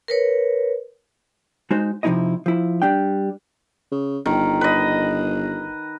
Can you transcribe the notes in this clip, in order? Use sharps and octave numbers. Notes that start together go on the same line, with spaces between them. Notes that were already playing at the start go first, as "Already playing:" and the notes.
A#4 B4 C#5
G#3 D#4 F#4 C5
C3 F3 C#4 D#4 E4 D#5
F3 E4
G3 D4 G5
C#3
G1 D#3
B4 D#5